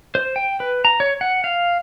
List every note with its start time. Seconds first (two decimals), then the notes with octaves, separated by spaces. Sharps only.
0.15 C5
0.36 G5
0.60 B4
0.85 A#5
1.00 C#5
1.21 F#5
1.44 F5